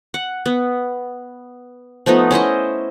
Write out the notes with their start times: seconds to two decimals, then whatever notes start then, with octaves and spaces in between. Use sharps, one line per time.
0.14 F#5
0.46 B3
2.06 F3 A3 B3 D#4
2.31 C#4 E4 C5 D#5